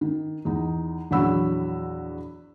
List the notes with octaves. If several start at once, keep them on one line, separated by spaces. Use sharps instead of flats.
D#3
E2 D#4
A#1 E2 F#3 F#4 B5 E6